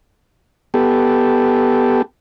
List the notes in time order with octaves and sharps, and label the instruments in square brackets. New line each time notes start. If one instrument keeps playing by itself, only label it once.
[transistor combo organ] B3 G4 A4